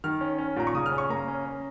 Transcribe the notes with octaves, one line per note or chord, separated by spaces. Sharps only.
D#3 F6
C#4
C#4
A#2 A#5
C#6
C#3 D#6
F6
C#4
C#6
A#3 A#5
C#4
C#4